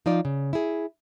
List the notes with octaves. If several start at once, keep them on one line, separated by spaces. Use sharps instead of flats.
F3 D#4 F4 D5
C#3
E4 G#4